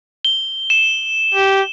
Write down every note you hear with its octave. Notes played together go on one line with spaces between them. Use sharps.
G7
E7
G4